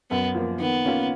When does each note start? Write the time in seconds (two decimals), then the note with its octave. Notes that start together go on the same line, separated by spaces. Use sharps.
0.11 F#2 B3
0.35 F3 A#3
0.60 D#3 B3
0.84 A#3 C#4 F4 A#4